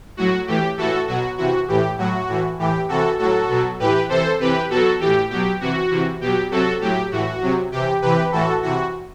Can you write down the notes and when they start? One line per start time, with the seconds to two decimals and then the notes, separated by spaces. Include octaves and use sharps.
0.17 A2 F#3 F#4
0.47 A2 E3 G4
0.77 A2 E3 F#4 A4
1.08 B2 F#3 F#4
1.38 C3 E3 F#4
1.68 A2 E3 G4
1.98 A2 F#3 F#4
2.28 A2 E3
2.59 A2 E3 G4
2.88 C3 E3 F#4 A4
3.19 A2 F#3 F#4 A4
3.49 B2 F#3
3.79 A2 E3 G4 B4
4.09 C3 E3 A4 C5
4.40 C3 E3 G4 B4
4.70 B2 F#3 F#4 A4
5.00 A2 E3 G4
5.30 B2 F#3 G4
5.60 C3 E3 F#4
5.91 C3 E3
6.21 B2 F#3 G4
6.51 C3 F#3 F#4 A4
6.81 A2 F#3 G4
7.11 A2 E3 F#4
7.41 C3 F#3
7.72 C3 E3 G4
8.02 C3 E3 G4 B4
8.32 A2 E3 F#4 A4
8.63 C3 E3 F#4